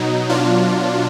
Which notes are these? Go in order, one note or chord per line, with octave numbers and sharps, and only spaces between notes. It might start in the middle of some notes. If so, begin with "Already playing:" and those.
Already playing: B2 F#3 D#4
B2 F#3 D4 F4